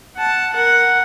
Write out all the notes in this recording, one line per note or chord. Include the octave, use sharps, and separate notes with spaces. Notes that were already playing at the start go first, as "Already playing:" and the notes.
F#5 A5
A#4 F#5